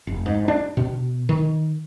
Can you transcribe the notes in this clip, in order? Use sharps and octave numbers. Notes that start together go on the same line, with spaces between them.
F1
G#2
D4
B2
D#3